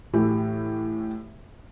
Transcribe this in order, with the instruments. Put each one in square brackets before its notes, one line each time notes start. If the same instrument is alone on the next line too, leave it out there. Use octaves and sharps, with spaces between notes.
[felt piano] A2 E3 E4 F#4 G4